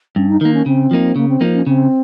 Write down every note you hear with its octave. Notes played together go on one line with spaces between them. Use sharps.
G2 C#4
D#4
D#3 A#3 D#4
C#4
C#3 C4
F3 A#3 D#4
C#3 A#3
C4
F3 A#3 D#4
C#4
C#3 C4